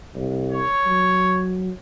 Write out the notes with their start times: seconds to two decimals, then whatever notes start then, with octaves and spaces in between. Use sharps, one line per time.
0.15 C2
0.51 C#5
0.86 F#3